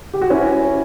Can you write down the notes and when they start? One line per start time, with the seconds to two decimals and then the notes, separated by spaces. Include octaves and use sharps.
0.14 G4
0.22 F#4
0.30 C#4 E4